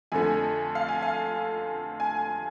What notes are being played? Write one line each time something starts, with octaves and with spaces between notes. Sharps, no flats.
F2 D3 A3 G#5
F5
G#5
F5
G#5